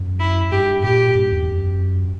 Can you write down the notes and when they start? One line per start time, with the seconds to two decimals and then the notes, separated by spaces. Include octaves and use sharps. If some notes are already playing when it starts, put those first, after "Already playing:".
Already playing: F#2
0.20 E4
0.51 G2 G4
0.83 A#2 G4
1.15 G2
1.31 E2
1.47 F#2